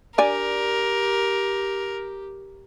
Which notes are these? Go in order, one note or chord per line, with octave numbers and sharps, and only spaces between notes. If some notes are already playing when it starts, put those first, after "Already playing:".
D4 G4 A#4 D5 G#5